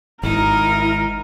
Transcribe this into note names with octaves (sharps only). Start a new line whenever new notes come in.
G#1 G#2 D#4 E4 A#4